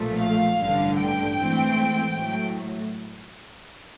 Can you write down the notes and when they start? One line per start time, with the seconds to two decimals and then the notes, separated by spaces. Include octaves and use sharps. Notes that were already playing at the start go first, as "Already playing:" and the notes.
Already playing: B1 A#2 F3 A3
0.19 F5
0.58 A1 G2 D3
0.97 G5
1.37 G#2 E3 A3 C4
2.15 A2 F#3 A3